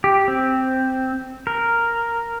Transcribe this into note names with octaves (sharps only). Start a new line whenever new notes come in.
G4
C4
A#4